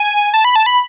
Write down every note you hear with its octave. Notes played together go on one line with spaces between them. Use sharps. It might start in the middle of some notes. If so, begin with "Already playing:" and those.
Already playing: G#5
A5
B5
A5
B5